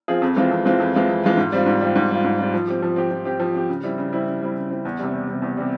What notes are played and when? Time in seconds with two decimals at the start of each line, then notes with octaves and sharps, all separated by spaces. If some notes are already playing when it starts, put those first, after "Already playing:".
0.08 F3 C4 F4 G#4
0.22 F2
0.36 E3 G#3 C4 F4
0.51 F2
0.65 E3 G#3 C4 F4
0.80 F2
0.94 E3 G#3 C4 F4
1.09 F2
1.23 E3 G#3 C4 F4
1.37 G#2
1.52 G3 C4 F4
1.66 G#2
1.81 G3 C4 F4
1.95 G#2
2.10 G3 C4 F4
2.24 G#2
2.39 G3 C4 F4
2.54 F3
2.67 C4 G4
2.82 F3
2.96 C4 G4
3.11 F3
3.25 C4 G4
3.40 F3
3.55 C4 G4
3.69 C#3
3.84 G3 C4 E4
3.98 C#3
4.13 G3 C4 E4
4.27 C#3
4.41 G3 C4 E4
4.56 C#3
4.70 G3 C4 E4
4.85 E2
4.99 C3 G3
5.13 E2
5.28 C3 G3
5.42 E2
5.57 C3 G3